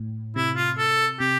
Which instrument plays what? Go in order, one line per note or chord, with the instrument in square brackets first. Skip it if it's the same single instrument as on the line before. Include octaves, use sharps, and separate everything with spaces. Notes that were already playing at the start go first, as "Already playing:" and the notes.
Already playing: [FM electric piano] A2
[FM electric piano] C3 [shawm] E4
[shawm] F4
A4
[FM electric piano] C3 [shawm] G4